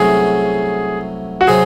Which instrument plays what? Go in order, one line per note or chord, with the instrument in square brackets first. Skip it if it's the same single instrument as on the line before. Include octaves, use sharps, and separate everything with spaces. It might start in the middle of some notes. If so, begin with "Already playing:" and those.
Already playing: [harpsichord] C2 C3 F#3 A3 C#4 [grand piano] G#4
[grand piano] F#4
[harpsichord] C3 F#3 C4 [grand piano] G#4